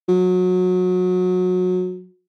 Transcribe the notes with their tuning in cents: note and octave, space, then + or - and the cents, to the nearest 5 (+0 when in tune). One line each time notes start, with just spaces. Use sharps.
F#3 -25